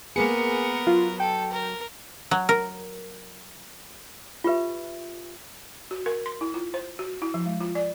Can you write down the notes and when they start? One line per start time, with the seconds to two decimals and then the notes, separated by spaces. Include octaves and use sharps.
0.16 G#3 A#3 B3 G#4 A#4 C#7
0.87 F#3 F4
1.20 A4 G5
1.53 A#4
2.31 F#3
2.49 A#4
4.44 F4 G4 B4 E5
5.91 F#4
6.06 A#4
6.26 C6
6.41 E4
6.54 F4
6.74 C5
6.99 F#4
7.22 E4
7.34 F3
7.46 G#3
7.60 F4
7.75 D5